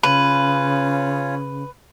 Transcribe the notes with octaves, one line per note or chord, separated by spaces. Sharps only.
C#3 C#4 F4 B4 C#5